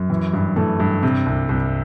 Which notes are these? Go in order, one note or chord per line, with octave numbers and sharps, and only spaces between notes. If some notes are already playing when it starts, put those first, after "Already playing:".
Already playing: F#2
E3
G2
E3 A3
G2
C3
C2
C2